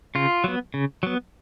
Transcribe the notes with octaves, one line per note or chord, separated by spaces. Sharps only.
C#3 F4
F#3 B3
C#3
F#3 B3